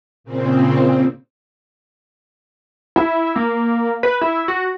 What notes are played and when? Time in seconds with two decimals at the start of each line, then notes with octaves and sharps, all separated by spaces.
0.24 A#2 C#3 C4
2.96 E4
3.36 A#3
4.03 B4
4.21 E4
4.48 F#4